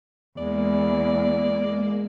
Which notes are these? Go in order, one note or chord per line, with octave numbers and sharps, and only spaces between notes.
E2 G#3 A#3 D5